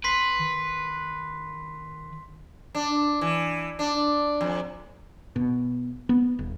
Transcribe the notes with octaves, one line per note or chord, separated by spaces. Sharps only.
G#1 B4 C6 B6 C7
D#3
D4
E3
D4
F2
B2
B3
D#1